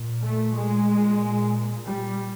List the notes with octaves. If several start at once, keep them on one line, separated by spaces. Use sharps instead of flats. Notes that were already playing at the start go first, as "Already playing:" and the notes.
Already playing: A#2
A3
G#3
G3